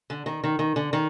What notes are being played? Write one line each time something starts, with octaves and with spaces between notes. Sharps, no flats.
D3
D#3
D#3
D#3
D3
D#3